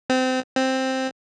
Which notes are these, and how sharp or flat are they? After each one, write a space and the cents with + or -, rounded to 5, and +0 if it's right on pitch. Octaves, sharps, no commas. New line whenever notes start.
C4 -25
C4 +5